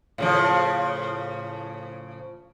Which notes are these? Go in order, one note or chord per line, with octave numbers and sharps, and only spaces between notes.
A2 C#3 F3